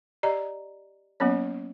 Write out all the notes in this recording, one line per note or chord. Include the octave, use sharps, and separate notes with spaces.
G4 D5 D#5 A#5
F#3 A#3 B3 C#4 C#5